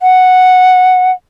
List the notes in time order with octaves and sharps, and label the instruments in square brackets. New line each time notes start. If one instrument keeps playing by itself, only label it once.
[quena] F#5